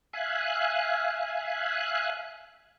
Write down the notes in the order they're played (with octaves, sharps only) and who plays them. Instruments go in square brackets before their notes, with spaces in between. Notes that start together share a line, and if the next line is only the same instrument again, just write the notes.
[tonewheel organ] E5 F5 G#5 F#6